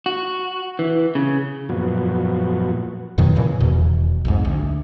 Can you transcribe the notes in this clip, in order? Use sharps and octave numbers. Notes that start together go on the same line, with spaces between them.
F#4
E3
C#3
F#2 A#2 F3 B3 F#4
F2 B2 D#3 F#3
A#2 C#3 E3
D#1 E2 B2
B1 F2 G#2
D2